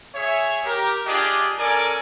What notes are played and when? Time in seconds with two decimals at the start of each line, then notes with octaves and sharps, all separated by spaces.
0.14 G#4 C#5 E5
0.65 G4 A#4
1.06 D4 F4 G4 G#4 D5 D#5
1.58 C#4 A4 A#4 D5 G#5 D6